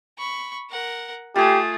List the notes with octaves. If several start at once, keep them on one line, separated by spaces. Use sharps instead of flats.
B5 C#6
A#4 F#5
A3 F4 G4 G#4